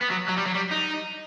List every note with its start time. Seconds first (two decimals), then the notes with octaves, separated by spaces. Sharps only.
0.02 B3
0.11 F#3
0.29 F#3
0.38 G3
0.46 F#3
0.55 G3
0.72 D#4